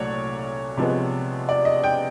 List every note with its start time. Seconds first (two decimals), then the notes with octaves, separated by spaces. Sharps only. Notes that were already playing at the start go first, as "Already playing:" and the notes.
Already playing: C2 A#2 F#3 A3 C#5 D5
0.77 C3 F3 G#3 B3
1.49 D5
1.65 D#5
1.84 G5